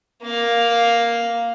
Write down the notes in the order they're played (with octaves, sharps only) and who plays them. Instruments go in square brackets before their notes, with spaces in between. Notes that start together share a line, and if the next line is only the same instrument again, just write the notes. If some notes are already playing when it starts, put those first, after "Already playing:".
[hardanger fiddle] A#3 F5